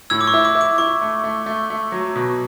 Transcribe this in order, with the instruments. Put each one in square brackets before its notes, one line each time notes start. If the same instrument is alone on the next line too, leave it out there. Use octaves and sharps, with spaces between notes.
[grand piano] A2 [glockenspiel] E6 G#6
[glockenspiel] D6
C#6
[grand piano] E4
[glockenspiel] D6
[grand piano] E4
[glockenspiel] D6
[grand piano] E4 [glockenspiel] C#6
[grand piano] A3
A3
A3
A3
F#3
B2